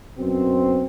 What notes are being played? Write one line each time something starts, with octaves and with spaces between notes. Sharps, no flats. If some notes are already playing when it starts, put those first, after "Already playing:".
F#2 B2 C4